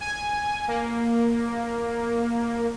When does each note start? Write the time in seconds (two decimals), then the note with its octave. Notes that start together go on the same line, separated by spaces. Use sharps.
0.01 G#5
0.68 A#3